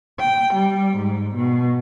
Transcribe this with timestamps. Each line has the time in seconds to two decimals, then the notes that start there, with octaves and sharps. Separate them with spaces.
0.19 G5
0.54 G3
0.97 G#2
1.35 B2